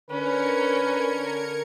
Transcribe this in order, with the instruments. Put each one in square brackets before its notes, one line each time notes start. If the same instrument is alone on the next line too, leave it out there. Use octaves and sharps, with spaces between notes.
[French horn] D3 [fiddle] C#4 [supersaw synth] A#4 G#6 C#7 [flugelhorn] B4